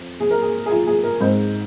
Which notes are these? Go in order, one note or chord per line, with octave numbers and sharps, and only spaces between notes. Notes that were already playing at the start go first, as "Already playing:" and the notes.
Already playing: F2
G#4
A#4
G#4
G#4
F4
G#4
A#4
G#2 G#3 C4 D#4 C5